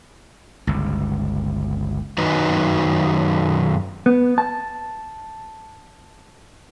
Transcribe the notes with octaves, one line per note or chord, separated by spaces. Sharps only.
G1 C#2
F#2 D#3 D#4 F#4 B4 D#5
B3
A5